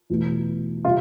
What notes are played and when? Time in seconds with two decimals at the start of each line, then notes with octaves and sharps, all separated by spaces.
0.10 E2 B2 A3
0.84 C3 G3 F4